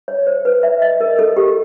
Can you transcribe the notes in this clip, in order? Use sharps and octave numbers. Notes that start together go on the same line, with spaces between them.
C#5
C5
B4
E5
D#5
A#4
A4
G4